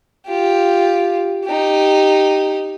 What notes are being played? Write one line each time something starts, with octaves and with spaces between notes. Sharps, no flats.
F4 G4
D#4 G4